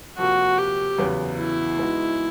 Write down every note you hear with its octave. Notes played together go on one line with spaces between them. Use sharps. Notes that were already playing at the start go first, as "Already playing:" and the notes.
F2 C3 F3 A#3 F#4
G4
E2 C#3 F#3 B3
E4
G#3 B3 D#4 F#4